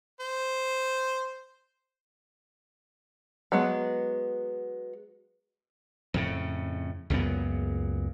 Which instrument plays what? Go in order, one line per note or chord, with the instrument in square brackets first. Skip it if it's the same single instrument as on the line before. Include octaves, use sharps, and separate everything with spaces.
[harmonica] C5
[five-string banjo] F#3 G#3 B3
[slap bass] F2 A2 C#3
C#2 F#2 A#2 B3